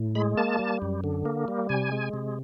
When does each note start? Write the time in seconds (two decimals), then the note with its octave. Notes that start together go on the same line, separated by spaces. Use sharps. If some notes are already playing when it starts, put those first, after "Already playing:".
Already playing: A2
0.15 G#3 B5
0.37 A#3 A5
0.59 G3
0.82 F#2
1.04 D3
1.25 A#3
1.48 G3
1.69 C3 G#5
1.92 G#3
2.13 C3